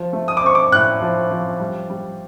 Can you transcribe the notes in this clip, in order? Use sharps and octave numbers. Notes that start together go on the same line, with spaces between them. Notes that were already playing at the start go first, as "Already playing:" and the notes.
Already playing: F3
A3
D#6
D6
C4 C#6
D6
A2 F#6
F3
F3
G3
G3